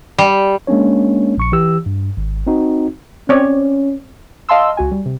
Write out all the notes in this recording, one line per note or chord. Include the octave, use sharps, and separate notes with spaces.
G3
G#3 A#3 C#4 D4 C#5
A#1 C#6 C#7
E3 G4 E6
G2
G#1
C4 D#4 F#4
C4 C#4 C#5 D5
D#5 F5 A5 C6 E6
C#2 F#4 G#5
G3
C3